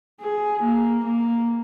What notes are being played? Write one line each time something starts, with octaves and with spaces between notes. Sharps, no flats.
G#4
A#3
A#3